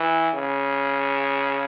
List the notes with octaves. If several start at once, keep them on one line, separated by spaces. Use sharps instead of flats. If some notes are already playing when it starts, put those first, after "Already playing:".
Already playing: E3
C#3